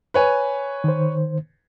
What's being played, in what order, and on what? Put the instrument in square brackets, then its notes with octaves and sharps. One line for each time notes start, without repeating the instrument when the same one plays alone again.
[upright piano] B4 C#5 G#5
[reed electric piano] D#3 C5